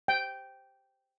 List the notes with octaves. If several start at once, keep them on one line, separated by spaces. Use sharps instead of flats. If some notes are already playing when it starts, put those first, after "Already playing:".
G5